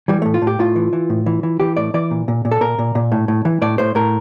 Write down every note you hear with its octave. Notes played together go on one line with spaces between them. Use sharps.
E3 G3
A2 A3
F4
A2
G4
A2 F4
E3
E3
A2
E3
E3
E3 G4
A2 D5
E3 D5
A#2
A#2
A#2
A4
A#2 A#4
A#2
A#2
A2
A2
E3
A2 D5
A2 C5
A2 A#4